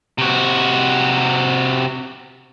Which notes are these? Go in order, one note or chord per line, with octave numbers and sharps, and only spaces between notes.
C3 F#4